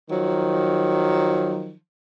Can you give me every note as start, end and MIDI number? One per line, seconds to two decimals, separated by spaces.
0.10 1.74 51
0.10 1.74 53
0.10 1.74 54